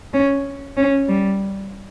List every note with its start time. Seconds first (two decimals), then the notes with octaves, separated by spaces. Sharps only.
0.13 C#4
0.77 C#4
1.08 G3